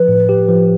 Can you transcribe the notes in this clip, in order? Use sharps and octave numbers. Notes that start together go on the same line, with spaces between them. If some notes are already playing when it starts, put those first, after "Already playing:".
Already playing: F3 B4
A2
G4
F3